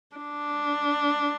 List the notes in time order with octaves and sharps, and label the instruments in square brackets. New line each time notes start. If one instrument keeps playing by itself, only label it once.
[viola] D4